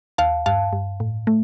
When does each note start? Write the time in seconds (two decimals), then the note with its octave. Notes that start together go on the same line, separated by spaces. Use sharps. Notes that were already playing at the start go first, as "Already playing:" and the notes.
0.18 D#2 F5 A5
0.46 G2 F5 A5
0.73 G2
1.00 A2
1.27 A3